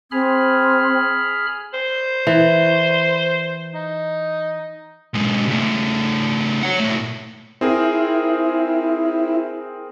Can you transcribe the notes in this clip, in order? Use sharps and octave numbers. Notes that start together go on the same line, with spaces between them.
C4 G#4 B5 F6
C5
E3
D#4
B1 G#3
C#3 A3
C#5 F#5
A#2 A3
C4 E4 G#4 A#4